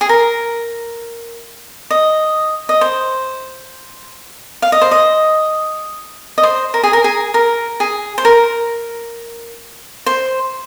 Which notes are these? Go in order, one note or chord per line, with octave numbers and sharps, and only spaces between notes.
G#4
A#4
D#5
D#5
C5
F5
D#5
C5
D#5
D#5
C5
A#4
G#4
A#4
G#4
A#4
G#4
C5
A#4
C5